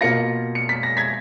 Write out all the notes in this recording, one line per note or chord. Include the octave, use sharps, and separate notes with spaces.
B2 A#3 F4 A#6 C#7
C#7
B6
A#6
G#6 B6